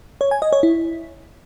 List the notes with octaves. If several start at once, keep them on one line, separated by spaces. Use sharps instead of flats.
C#5
G#5
D#5
C#5
E4